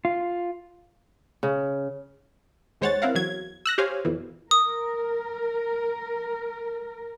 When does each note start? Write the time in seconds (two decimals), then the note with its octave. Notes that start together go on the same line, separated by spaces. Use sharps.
0.05 F4
1.43 C#3
2.81 D#2 G#3 C5 C#5 F#5 A6
3.02 C4 E4 A#4 F5 F#5
3.15 E2 F#3 G#6
3.66 E6 F#6 A#6
3.78 G4 C5 C#5 F5 G#5
4.05 F2 B2 E3
4.51 A#4 D#6